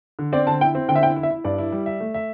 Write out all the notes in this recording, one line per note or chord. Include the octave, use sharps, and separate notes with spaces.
D3
C4 D5
D3 A5
E4 G5
C4
D3 G5
E5
E4 G5
E4
E5
E4
G2 D5
E4
G3
E5
A3
E5